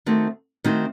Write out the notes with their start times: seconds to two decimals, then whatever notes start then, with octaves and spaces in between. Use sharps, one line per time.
0.06 D#3 A3 C4 D#4 F#4
0.64 D#3 A3 C4 D#4 F#4